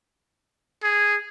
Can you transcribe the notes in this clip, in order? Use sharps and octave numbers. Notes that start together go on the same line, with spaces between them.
G#4